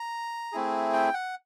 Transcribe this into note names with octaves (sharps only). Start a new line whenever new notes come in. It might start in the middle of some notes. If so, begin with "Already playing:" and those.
Already playing: A#5
A3 C4 E4 G#4
G5
F#5